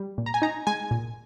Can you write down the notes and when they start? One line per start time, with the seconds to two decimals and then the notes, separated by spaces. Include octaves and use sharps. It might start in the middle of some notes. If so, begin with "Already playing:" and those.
Already playing: G3
0.18 A#2
0.26 A#5
0.34 G#5
0.42 D#4 A#5
0.67 G#3 G#5
0.91 A#2